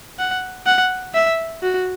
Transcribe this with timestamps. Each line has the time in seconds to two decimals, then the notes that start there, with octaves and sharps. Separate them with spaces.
0.19 F#5
0.66 F#5
1.14 E5
1.63 F#4